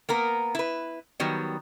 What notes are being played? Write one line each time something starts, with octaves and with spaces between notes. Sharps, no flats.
A#3 B3 A#4
E4 B4
D#3 F#3 G3 B3